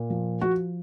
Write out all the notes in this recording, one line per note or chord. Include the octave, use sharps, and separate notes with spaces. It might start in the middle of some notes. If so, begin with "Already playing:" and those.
Already playing: A#2
F3
F3 F#4